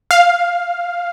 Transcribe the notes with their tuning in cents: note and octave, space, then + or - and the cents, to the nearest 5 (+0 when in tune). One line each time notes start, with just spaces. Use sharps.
F5 +5